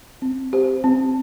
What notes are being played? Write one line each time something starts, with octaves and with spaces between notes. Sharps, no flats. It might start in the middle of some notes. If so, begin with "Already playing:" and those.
C4
G4 C5
C4